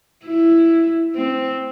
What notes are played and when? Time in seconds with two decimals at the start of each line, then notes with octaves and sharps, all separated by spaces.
0.24 E4
1.15 C4